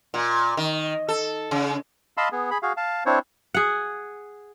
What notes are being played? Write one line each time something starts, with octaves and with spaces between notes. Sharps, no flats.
A#2
D#3
A4
C#3
D#5 F5 A5 B5 C6 E6
B3 G#4
G#4 B5
F#4 G#4 F5
F5 A5
C4 D4 E4 C5 C#5
G#4 F#5